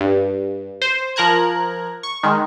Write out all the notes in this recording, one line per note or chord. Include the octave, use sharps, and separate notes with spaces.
G2
C5
F3 A#4 A#5 F#6 G#6
C#6
D#3 G#3